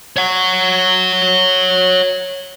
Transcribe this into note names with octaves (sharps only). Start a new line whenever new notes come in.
C#5 F#5